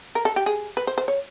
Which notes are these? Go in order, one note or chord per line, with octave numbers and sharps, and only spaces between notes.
A#4
A4
G4
G#4
B4
C5
C5
C#5